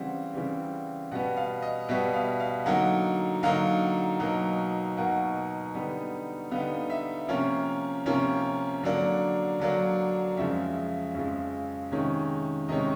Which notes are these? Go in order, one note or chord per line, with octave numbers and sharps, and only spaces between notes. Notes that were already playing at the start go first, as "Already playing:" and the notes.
Already playing: C#3 E3 G3 C4 F#5
C#3 E3 G3 C4
B2 G3 B3 F#5
F5
D#5
B2 G3 B3 E5
F5
F5
D3 F#3 A#3 D#4 F#5
D3 F#3 A#3 D#4 F5
B2 F#3 A#3 D#4
B2 F#3 A#3 D#4 F#5
D3 G3 B3 D#4
D3 G3 B3 D#4 F5
E5
C3 F3 A#3 C#4 F5
C3 F3 A#3 C#4
D3 F#3 A#3 D4
D3 F#3 A#3 D4
F2 C#3 F3 G#3 E5
F2 C#3 F3 G#3
C3 D#3 G#3 C#4
C3 D#3 G#3 C#4 D#5